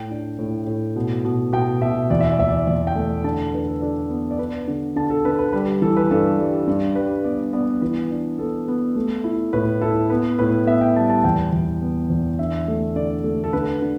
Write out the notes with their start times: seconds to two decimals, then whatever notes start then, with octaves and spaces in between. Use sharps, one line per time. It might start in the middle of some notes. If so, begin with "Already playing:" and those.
Already playing: A2 G5
0.10 D4
0.39 A2
0.67 A2
0.96 B2
1.25 B2
1.53 B2 G5
1.81 B2 E5
2.10 E2 D5
2.21 E5
2.30 D5
2.39 E2 E5
2.49 D5
2.67 E2 D5
2.87 G5
2.96 A3
3.24 D3 A5
3.54 D4 B4
3.68 A4
3.81 D4 A4
4.10 B3
4.31 D5
4.39 D4 B4
4.68 D3
4.96 D3 A5
5.10 A4
5.25 D3 B4
5.39 B4
5.53 G3 B4
5.82 E3 A4
5.97 B4
6.11 G2 A4
6.40 G3
6.67 G2
6.95 G3 B4
7.24 B3 D5
7.53 B3 D5
7.82 E3 B4
8.11 D4
8.38 B3 A4
8.68 B3
8.95 A3
9.24 E4
9.53 A2 B4
9.81 E4 A4
10.10 B3 B4
10.39 A2 B4
10.67 B3 E5
10.81 G5
10.96 G3 A5
11.10 A5
11.24 E2 G5
11.53 E2
11.82 B3
12.10 E2
12.39 D3 E5
12.68 A3
12.96 D3 D5
13.24 A3
13.44 A4
13.53 D3 B4
13.82 D3